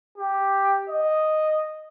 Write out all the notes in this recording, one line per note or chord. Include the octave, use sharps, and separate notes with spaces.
G4
D#5